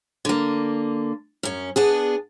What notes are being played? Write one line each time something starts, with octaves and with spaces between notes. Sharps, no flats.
D3 A#3
F#2 C#4
B3 D4 G#4